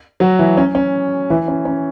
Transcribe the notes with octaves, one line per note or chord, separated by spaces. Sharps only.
F#3 F#4
E3 E4
C#4
C#4
E3 E4
C#4
C#4